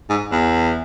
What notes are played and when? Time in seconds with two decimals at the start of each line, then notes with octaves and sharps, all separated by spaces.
0.09 G#2
0.32 E2